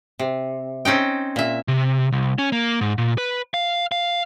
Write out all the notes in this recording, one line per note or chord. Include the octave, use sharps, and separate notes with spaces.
C3
C4 C#4 D#4 G5
A#2 E5
C3
C2
C#4
A#3
G#2
A#2
B4
F5
F5